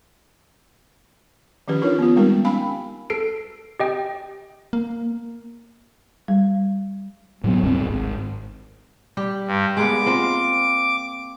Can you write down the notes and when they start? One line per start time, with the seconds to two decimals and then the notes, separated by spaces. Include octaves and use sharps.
1.68 D#3 F3 C#4 G4 B4
1.82 D4 D#4 F4 G4 A#4 C#5
1.99 B3 F4
2.16 G3 G#3 C4 D#4 G4 A#4
2.44 C#4 F5 G5 G#5 B5
3.10 A4 C7 D7
3.79 G4 D#5 G5
4.73 A#3
6.28 G3
7.44 A2 F#3 B3
7.63 C#2 G2 C4
7.88 G#1
9.17 G3 G4
9.48 G2
9.77 G#3 A#3 B3 D6
10.06 C4 F4 A#4